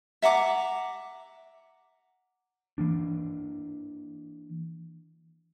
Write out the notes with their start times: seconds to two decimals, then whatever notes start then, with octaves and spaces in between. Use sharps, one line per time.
0.22 E5 F#5 A#5 D6
2.78 E3 A#3 D4